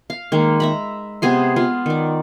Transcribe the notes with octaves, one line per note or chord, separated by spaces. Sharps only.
F5
D#3 G#3 A#3
E5 A#5 B5
C3 B3 G#4 C6
B3 F4
D#3 D5